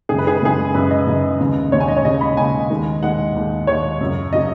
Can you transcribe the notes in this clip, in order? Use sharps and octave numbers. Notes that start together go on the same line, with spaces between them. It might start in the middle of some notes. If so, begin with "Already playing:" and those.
F#2 C#3 G#3 G#4
B4
G#4
B4
F#2 C#3 G#3 G#4
F#2 C#3 G#3 B4
D#5
F#2 C#3 G#3
D#2 C#3 G#3
D#2 C#3 G#3 C#5
G#5
D#5
C#5
D#2 C#3 G#3 D#5
B5
D#2 C#3 G#3 G#5
D#2 D#3 G#3
D#2 D#3 G#3 F#5
D#2 D#3 G#3
D#2 D#3 G#3 C#5
F#2 C#3 F#3
C#3 F#3 D#5